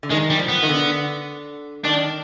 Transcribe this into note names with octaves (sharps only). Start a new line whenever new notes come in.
D3
D#3 G#3
G3
F3
B3
D#3
D3
D#3 D4